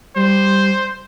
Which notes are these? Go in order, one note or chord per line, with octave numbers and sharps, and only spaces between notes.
G3 C5